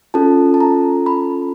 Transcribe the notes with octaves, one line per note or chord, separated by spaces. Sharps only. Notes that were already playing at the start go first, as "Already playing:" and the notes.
C#4 F4 A4 A5
A5
A#5
B5